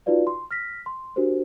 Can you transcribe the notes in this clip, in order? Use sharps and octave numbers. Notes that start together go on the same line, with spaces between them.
D#4 F4 F#4 B4 D5 F5
C6
F6 A#6 B6
C6
D4 F#4 G4 A#4 C5